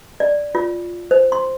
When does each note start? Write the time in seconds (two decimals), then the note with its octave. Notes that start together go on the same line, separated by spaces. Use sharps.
0.20 D5
0.55 F4
1.11 C5
1.32 C6